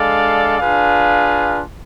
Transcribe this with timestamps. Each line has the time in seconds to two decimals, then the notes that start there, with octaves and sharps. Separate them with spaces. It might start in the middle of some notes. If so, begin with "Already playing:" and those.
Already playing: G#3 D4 A4 D5 F5
0.59 D4 F4 G#4 B4 F5